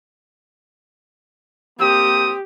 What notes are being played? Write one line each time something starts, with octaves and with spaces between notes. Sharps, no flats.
A#3 C4 G4 D#6